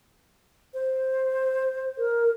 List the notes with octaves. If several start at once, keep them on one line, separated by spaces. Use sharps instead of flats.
C5
A#4